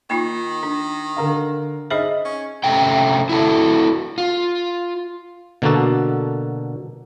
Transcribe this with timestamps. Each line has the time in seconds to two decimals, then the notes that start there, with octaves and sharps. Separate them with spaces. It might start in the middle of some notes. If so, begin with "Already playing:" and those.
0.10 D#3 A#3 D#4 F4
0.63 D4
1.16 D3 A#4 F5
1.90 D#4 G#4 C5 D#5 E5
2.25 C#4
2.64 C3 A3 C#4 G5
3.29 E4 F#4 A4
4.18 F4
5.62 B2 D3 A#3 D4 F#4 A4